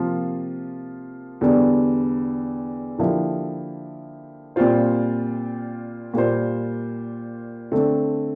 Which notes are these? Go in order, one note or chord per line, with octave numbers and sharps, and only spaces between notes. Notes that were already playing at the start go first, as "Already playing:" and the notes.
Already playing: C3 F3 A#3 F4 A#4
E2 D3 G3
D3 F3 A#3 E4 G4
A#2 G3 C4 F4 C5
A#2 G3 A#3 F4 C5
D3 A3 C4